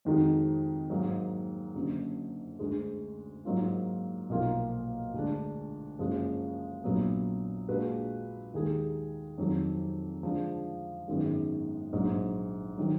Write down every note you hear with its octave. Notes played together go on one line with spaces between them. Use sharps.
F2 D#3 G#3 D#4 F#4
G#2 F#3 A#3
F#1 F#2 D3
D2 D3 G#3
G#2 F#3 A#3 F4
B1 A#2 F3 A#3 F4
D2 D3 G#3 D4
F#1 F#2 F3 G#3
A#1 A#2 F#3 B3
A#2 G#3 D4 F#4 B4
D#2 D#3 G#3 D#4 G#4
F2 D#3 F#3
D3 F3 G#3 D4
G#1 F#2 D#3 G#3 B3
A#1 G#2 F#3
D#3 F#3